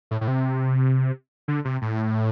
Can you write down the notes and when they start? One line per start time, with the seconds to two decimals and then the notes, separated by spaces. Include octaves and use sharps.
0.11 A2
0.21 A2
0.28 C3
1.48 D3
1.65 C3
1.82 A2